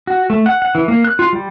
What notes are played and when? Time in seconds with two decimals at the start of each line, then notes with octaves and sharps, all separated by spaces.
0.07 F#4
0.30 A3
0.46 F#5
0.62 F#5
0.75 E3
0.88 A#3
1.04 F#6
1.19 F4
1.33 G3